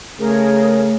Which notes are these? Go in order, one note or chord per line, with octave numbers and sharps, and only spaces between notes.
C#3 A3 G#4 A#4 C#5